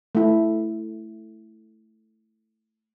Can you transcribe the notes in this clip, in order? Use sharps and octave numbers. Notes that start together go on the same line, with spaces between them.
A3 E4